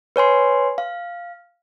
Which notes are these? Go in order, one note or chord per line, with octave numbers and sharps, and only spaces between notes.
B4 C#5 G#5 C6
F5